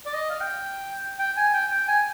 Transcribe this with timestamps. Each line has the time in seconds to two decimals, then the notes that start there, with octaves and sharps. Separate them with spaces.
0.06 D5
0.14 D#5
0.30 F5
0.40 G5
1.19 G5
1.37 G#5
1.53 G5
1.71 G5
1.88 G#5